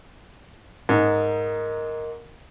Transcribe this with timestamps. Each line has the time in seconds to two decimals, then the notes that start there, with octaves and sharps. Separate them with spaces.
0.89 G#2 A#4 D#5